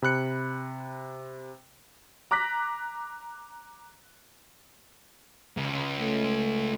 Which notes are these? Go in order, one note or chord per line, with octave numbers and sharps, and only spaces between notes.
C3 B5 F#6 C#7
A#5 D6 F#6 A#6 B6
C#2
A3